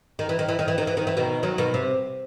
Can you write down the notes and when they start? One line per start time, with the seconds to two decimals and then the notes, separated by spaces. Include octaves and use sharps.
0.19 D#3
0.29 E3
0.39 D#3
0.49 E3
0.59 D#3
0.68 E3
0.78 D#3
0.87 E3
0.97 D#3
1.07 E3
1.17 B2 D#3
1.43 D#3 F#3
1.58 B2 D#3
1.74 C3